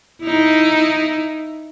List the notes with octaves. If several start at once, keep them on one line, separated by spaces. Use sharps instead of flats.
D#4 E4